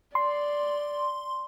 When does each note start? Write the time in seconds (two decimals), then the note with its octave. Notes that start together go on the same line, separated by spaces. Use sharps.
0.15 D5 C6